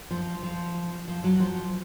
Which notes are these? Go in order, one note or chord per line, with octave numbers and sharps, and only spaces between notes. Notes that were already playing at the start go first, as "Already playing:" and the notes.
F3
F3
F3
F#3
F3